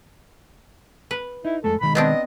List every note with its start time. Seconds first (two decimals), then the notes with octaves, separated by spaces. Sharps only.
1.11 B4
1.45 D#4 E4
1.64 F2 G#3 A3 A4
1.81 B1 D#3 G#3 B5
1.95 B3 C4 D4 D#5